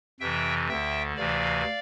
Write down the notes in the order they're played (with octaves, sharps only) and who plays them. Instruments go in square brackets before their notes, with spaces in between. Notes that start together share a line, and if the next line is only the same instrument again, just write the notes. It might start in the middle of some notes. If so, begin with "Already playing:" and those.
[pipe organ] F2 C3 E3 E5 G5
D2 D3 E5 G5
D2 C3 E3 D5 F5